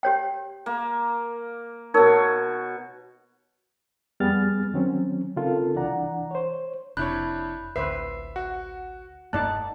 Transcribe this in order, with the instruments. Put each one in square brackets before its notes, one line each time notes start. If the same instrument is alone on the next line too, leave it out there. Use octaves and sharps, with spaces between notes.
[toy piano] G4 C#5 G5
[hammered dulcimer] A#3
[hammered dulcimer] B2 C#5 [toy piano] D#4 A#4
[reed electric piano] F2 G3 B3 G#4 F6 A6
D#3 F#3 C4 C#4
C#3 C4 D#4 F4 A4 A#4
C2 E3 D4 D5 F#5 A#5
C5 C#5
[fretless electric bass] F1 C3 [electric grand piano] D4 E4 C#5 [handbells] B5 F#6 G6
[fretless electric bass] A1 D2 [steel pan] B4 C5 [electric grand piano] E5 [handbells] C7
[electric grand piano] F#4 [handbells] F#5
[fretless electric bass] F1 G2 A#3 [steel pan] D#4 D5 A5 [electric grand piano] F#6